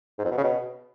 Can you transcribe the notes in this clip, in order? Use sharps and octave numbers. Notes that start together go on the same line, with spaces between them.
G#2
F2
B2
C#3
B2